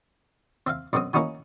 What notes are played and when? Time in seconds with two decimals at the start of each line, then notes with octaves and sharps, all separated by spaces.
0.67 C4 E5 F5
0.93 F#2 B2 F#3 C4 D#6
1.13 A#3 C#4 D#4 E4 F#4 G#5